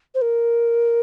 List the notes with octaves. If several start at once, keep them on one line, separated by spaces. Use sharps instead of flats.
C5
A#4